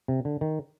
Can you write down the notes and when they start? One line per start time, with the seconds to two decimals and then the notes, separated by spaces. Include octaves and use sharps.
0.08 C3
0.25 D3
0.41 D#3